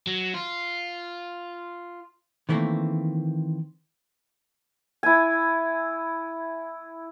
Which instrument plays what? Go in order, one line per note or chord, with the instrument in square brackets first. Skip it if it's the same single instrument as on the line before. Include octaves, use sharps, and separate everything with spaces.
[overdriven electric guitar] F#3
F4
[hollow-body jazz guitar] D#3 E3 A3 A#3 C4
[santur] E4 G#5